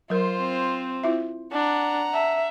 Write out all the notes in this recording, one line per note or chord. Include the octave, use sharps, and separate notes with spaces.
F#3 F4 A#4 C5
C4
E4 F4 E5
D4 F#5 A#5
E5 A5